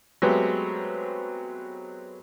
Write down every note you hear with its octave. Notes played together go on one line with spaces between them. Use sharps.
F#3 G#3 A3 B3 C4 G4